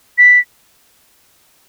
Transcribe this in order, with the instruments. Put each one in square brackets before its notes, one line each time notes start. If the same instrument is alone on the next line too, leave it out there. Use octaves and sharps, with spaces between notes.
[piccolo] B6